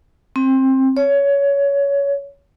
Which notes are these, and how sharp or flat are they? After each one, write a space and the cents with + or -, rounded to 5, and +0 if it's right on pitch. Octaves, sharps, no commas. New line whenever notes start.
C4 +20
C#5 +20